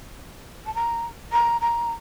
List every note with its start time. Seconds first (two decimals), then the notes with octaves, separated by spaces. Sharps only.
0.66 A5
0.75 A#5
1.32 A#5
1.61 A#5